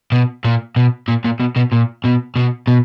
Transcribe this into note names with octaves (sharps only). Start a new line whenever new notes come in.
B2
A#2
B2
A#2
A#2
B2
B2
A#2
B2
B2
B2